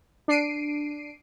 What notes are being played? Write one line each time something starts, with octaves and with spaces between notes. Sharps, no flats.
D4 C7 D7 D#7